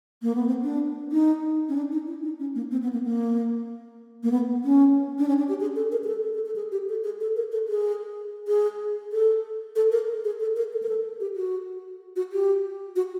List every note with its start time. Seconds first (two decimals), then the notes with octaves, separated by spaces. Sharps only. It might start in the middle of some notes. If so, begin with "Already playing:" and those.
0.22 A#3
0.35 B3
0.47 C4
0.64 D4
1.12 D#4
1.69 C#4
1.76 D4
1.92 D#4
2.07 E4
2.23 D#4
2.39 C#4
2.55 A#3
2.71 C4
2.83 B3
2.93 A#3
3.04 A#3
4.23 A#3
4.31 B3
4.64 C#4
5.19 D4
5.28 C#4
5.38 D4
5.49 G4
5.60 G#4
5.76 A4
5.92 A#4
6.04 G#4
6.08 A4
6.24 A4
6.34 A4
6.46 A4
6.56 G#4
6.72 G4
6.89 A4
7.04 G#4
7.21 A4
7.36 A#4
7.52 A4
7.68 G#4
8.48 G#4
9.13 A4
9.76 A4
9.92 A#4
10.24 G#4
10.40 A4
10.56 A#4
10.72 A4
10.83 A#4
10.89 A4
11.20 G4
11.36 F#4
12.16 F#4
12.33 G4
12.96 F#4